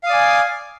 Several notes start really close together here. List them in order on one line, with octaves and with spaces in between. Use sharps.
F5 D#6 D5 G#5